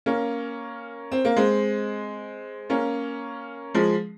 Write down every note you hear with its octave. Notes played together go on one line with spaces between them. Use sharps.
A#3 C#4
C4
A#3
G#3 C4
A#3 C#4
F3 G#3